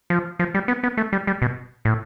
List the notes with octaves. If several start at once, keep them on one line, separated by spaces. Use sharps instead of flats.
F3
F3
G3
B3
B3
A3
G3
G3
B2
A2